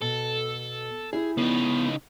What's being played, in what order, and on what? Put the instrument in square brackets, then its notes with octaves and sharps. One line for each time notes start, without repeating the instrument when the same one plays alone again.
[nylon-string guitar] B2 [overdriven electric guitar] A4
[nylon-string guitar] E4 G4 E5 [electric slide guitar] G#4
[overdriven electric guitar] C#3 D#4 [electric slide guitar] B3